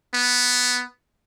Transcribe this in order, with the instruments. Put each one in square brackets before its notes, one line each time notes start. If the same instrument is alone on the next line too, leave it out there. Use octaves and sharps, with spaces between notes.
[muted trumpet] B3